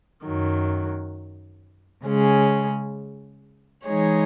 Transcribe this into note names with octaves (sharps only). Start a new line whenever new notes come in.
F#2 D#3 F#3
C#3 G#3 C#4 G#4
E3 G#3 D#4 G#4 C#5